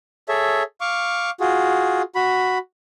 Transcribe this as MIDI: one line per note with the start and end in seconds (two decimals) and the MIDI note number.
0.29 0.63 68
0.29 0.63 69
0.29 0.63 73
0.29 0.63 76
0.81 1.30 77
0.81 1.30 85
0.81 1.30 86
1.40 2.02 65
1.40 2.02 66
1.40 2.02 68
2.15 2.58 66
2.15 2.58 83